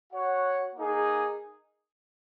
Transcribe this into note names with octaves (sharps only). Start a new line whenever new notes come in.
F#4 C#5 F#5
A#3 D#4 G#4